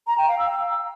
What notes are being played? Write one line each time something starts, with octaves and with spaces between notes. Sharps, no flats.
A#5
G5
F5
E6